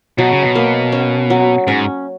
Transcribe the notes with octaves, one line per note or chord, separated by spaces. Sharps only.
B2 F#3
C#3
B2
A#3
C#4
F#3
G#2 C#4